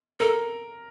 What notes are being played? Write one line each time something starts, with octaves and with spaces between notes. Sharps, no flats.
A4 A#4